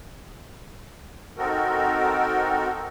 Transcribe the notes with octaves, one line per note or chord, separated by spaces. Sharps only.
C4 D#4 F#4 A4 A#4